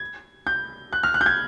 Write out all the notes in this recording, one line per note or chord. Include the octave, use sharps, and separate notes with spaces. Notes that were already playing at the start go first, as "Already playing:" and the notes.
Already playing: G#6
G6
F#6
F6
F#6
G6
G#6